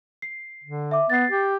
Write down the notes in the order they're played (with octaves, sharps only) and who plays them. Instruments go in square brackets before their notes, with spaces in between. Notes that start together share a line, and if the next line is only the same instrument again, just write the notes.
[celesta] C7
[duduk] D3
[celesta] E5 D6
[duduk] B3 [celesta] A6 C7
[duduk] G4